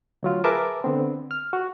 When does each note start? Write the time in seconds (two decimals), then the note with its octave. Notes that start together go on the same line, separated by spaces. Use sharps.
0.23 D2 F#3 F4
0.44 G#4 A#4 B4 E5 A5 D6
0.84 D3 B3 C4
1.31 F6
1.53 F#4